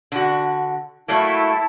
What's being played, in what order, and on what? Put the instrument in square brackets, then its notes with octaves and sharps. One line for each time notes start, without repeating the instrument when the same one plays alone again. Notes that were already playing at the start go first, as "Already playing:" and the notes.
[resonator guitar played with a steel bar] D3 F#4
[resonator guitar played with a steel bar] F#3 A3 A#3 [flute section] E4 A5